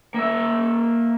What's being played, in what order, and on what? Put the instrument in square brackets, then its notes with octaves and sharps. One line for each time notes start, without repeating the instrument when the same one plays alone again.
[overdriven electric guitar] A#3 E5